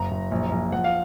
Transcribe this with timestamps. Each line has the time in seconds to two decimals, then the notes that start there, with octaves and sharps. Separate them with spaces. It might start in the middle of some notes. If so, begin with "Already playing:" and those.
Already playing: F#1 A#5
0.11 F#1
0.31 A#1
0.51 A#1
0.72 F3 F#5
0.84 F5